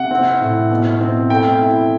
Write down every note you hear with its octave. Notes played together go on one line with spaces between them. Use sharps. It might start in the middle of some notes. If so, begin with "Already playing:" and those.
Already playing: C3 F#5
C4
A2
B2
C4
A3 G5
E4